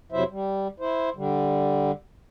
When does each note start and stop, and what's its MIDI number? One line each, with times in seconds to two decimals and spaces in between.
0.12 0.24 41
0.12 0.24 48
0.12 0.24 54
0.12 0.24 64
0.12 0.24 72
0.12 0.24 76
0.30 0.68 55
0.80 1.10 64
0.80 1.10 72
1.16 1.92 50
1.16 1.92 55